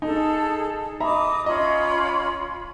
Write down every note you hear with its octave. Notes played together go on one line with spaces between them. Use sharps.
D#4 G#4 A4 A5
D#5 E5 A#5 B5 D6 D#6
C#4 F4 D#5 B5